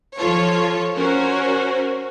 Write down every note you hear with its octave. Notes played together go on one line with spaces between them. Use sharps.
F3 F4 A4 C#5
C#4 F#4 A#4 C5